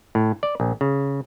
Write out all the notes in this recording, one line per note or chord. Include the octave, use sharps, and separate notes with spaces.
A2
D5
A#1
C#3